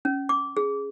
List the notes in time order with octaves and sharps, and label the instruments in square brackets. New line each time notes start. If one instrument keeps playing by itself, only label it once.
[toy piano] C#4
D6
G#4